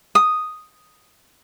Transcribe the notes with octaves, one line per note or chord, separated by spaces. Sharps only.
D#6